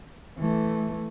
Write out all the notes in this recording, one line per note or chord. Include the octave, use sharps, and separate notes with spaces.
E3 A3